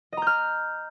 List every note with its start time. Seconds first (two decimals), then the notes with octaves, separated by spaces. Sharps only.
0.13 D#5
0.17 A#5
0.22 G6
0.27 F6